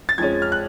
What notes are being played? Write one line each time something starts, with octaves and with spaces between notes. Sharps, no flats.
A6
F2 F3 G#3 C#4 G#6
F6
F#6